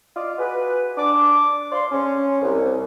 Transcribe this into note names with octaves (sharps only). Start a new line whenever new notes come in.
F4 D5 D#5 F5
F#4 G#4 B4
D4 A5 D6
D5 F5 C6
C#4
C2